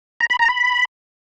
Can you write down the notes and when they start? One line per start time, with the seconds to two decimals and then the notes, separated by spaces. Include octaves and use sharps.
0.20 A#5
0.30 B5
0.39 A#5
0.49 B5